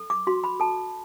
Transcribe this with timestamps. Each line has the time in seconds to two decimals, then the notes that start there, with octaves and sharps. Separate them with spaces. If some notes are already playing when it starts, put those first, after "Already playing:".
Already playing: A4
0.10 D6
0.27 F#4 C6
0.44 B5
0.60 A4 A5